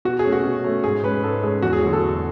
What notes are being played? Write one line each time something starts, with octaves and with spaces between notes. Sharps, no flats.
B2 F#4
G#4
A3 C#4
F#4
B2
A3 C#4
G#2 G#4
G#3 C#4 B4
G#2 A4
G#3 C#4 G#4
E2 F#4
G#4
D3 F#3 A3 F#4
A4
E2